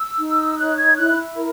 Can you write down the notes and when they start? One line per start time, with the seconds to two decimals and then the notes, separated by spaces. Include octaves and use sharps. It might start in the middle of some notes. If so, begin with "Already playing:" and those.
Already playing: E6
0.19 D#4
0.58 C#5 F#6
0.78 G#6
0.97 E4 F#6
1.35 A#4